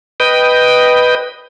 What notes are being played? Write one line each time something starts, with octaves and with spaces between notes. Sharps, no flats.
B4 D#5 G5